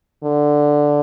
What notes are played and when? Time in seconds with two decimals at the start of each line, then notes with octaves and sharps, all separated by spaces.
0.24 D3